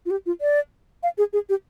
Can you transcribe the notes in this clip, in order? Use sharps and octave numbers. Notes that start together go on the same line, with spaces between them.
F4
G4
F4
D5
F5
G#4
G#4
G4